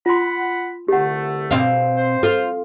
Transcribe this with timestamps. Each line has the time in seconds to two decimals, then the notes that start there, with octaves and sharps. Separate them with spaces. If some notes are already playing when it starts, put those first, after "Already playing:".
0.06 F4 F#5 B5 C6
0.88 C2 D3 A3 G4 F#5
1.51 B2 C4 F5
1.97 C5
2.23 F4 A4